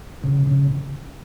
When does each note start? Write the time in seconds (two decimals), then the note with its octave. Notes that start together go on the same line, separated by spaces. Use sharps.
0.24 C#3
0.47 C#3